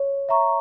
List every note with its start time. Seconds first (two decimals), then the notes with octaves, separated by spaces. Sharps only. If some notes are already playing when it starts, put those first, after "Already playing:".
Already playing: C#5
0.29 E5 A#5 C#6